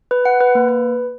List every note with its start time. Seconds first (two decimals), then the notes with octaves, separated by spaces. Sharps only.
0.11 B4
0.25 F#5
0.40 B4
0.55 A#3
0.68 B4